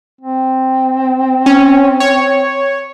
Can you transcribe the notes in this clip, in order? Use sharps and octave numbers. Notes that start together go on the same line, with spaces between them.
C4
C#4
C#5